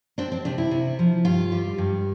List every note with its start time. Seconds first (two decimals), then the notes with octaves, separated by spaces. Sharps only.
0.18 C4 D4
0.32 C4
0.45 C3 D4
0.58 E4
0.71 C3
0.99 F3
1.25 G2 F4
1.52 G3
1.78 G2